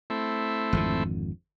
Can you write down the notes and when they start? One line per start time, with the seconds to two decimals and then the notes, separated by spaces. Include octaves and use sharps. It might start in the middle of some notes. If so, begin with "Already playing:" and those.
0.10 A3 C4 E4
0.73 G#1 F2 D3